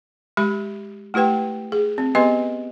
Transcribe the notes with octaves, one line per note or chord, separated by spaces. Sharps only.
G#3 G4 E5 B5
A3 E4 G4 B4 G5
G#4
C4
B3 G4 B4 D#5 C6